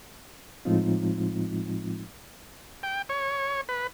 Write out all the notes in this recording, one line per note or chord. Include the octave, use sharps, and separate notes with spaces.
A2 F3 G#3 C4 D#4 F4
G5
C#5
B4